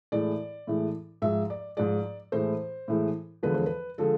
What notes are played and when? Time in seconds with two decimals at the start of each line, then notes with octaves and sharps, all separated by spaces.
0.12 A2 E3 G#3 D5
0.67 A2 E3 G#3
1.22 G#2 F3 G#3 E5
1.50 D5
1.77 G#2 F3 G#3 D5
2.32 A2 E3 G#3 C5
2.88 A2 E3 G#3
3.43 E2 D3 F3 G#3 B4
3.54 C5
3.66 B4
3.98 D3 F3 G#3 A4